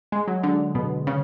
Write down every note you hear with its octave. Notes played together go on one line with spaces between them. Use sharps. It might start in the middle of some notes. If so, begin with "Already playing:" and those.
G#3
F#3
D3
B2
C#3